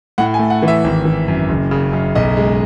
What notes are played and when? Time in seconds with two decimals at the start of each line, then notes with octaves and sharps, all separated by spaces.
0.18 A2 F#5
0.34 G#5
0.39 A3
0.50 F#5
0.62 E3
0.68 E5
0.84 G#1
1.05 E3
1.28 F#2
1.49 F#1
1.71 C#3
1.93 F#2
2.15 B1 D#5
2.37 G#3